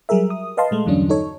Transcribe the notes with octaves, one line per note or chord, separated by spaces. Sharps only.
F#3 G3 G#4 A#4 E5
D#6
B4 D#5 F5 A5 C6
A#2 G#3 A3
E2 G2 D3 F#3 C#4 D4
D#4 A4 C#5